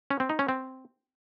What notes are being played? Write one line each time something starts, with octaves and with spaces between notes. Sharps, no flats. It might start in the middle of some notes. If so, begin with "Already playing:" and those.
C#4
C4
D#4
C#4
C4